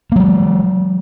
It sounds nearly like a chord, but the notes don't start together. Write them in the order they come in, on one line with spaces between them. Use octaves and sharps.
A#3 F#3 G#3